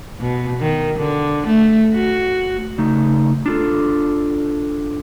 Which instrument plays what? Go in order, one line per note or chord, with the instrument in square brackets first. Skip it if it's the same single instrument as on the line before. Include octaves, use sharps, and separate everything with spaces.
[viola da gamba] B2
D#3
D3
A3
F#4
[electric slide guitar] C#3 A3 D#4
D4 F4 A4